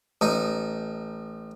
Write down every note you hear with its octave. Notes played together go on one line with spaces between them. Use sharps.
A1 D#4